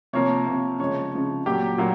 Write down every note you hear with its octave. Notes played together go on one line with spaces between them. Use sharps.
C3 F3 A#3 C#5
C3 F3 A#3
C#3 F3 G#3 C#5
C#3 F3 G#3
A#2 F#3 A#3 G4
A#2 F#3 A#3